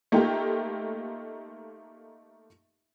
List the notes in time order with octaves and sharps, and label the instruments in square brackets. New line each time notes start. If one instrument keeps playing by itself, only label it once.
[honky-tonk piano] A3 A#3 D#4 F4 G4